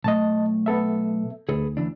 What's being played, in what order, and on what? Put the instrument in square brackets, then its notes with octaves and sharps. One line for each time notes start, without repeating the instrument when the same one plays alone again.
[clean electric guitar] B1 A3 [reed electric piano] D#5 A5
[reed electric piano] B3 A4 E5
[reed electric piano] D2 [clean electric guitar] G#4 A4 B4
[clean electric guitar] D2 E3 D4